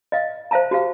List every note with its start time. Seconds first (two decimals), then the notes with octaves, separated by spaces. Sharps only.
0.12 D#5 F5
0.51 C5 E5 F5 A5 A#5
0.71 F#4 G4 F5